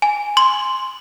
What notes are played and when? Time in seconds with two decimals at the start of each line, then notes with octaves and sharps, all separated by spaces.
0.02 G#5
0.37 C6